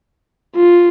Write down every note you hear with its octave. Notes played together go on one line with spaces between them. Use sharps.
F4